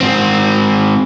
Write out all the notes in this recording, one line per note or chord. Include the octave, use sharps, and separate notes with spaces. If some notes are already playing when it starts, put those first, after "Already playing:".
G#2 C4